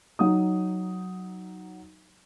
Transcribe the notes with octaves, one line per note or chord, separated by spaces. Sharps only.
F#3 D#4 D#6